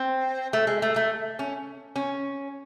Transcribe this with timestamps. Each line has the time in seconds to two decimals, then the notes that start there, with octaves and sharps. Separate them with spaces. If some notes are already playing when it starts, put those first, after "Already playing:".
Already playing: C4
0.53 A3
0.67 G#3
0.82 A3
0.96 A3
1.39 C#4
1.96 C#4